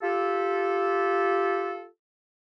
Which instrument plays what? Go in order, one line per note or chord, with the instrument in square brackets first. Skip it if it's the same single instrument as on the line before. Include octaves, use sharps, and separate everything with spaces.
[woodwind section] F4 G4 A4